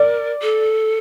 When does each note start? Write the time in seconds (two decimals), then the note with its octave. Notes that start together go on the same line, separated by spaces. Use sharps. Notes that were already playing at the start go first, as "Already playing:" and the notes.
Already playing: A#4 D5
0.41 A4